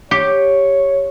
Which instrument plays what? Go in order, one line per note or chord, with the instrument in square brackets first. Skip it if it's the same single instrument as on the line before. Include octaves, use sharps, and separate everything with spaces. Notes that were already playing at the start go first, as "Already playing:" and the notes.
[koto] G4 [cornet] C#5